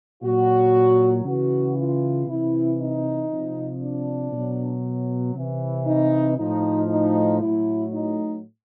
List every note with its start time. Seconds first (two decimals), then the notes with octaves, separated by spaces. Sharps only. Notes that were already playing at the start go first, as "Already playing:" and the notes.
0.23 A#2 F#3 F#4
1.25 C#3 E3 F#4
1.77 F4
2.28 C3 E3 E4
2.79 D#4
3.31 C3 F3
3.82 D4
4.33 B2 F#3
5.36 C3 E3
5.87 D#4
6.38 A2 F3 D#4
6.89 D#4
7.40 A2 F#3 E4
7.92 D#4